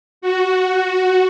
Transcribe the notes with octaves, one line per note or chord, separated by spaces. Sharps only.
F#4